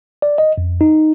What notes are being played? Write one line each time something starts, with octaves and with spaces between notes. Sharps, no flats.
D5
D#5
F2
D#4